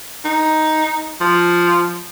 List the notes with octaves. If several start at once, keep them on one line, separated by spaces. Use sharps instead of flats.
D#4
F3